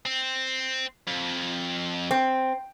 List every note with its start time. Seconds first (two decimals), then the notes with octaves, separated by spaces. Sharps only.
0.05 C4
1.07 F2
2.11 C4